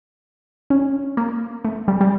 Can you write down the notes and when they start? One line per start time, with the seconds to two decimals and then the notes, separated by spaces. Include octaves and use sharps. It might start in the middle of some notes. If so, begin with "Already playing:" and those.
0.70 C#4
1.17 A#3
1.65 A3
1.88 G3
2.01 G3